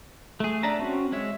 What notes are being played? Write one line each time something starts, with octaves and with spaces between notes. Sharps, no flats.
A3 G#4
D4 D5 E5 A5 A#5
C4 C#4 F#4
G#3 C#5 E5